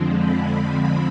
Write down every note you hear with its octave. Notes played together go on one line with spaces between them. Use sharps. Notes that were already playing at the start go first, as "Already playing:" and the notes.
Already playing: F2 D3 F3 G#3 C4
B5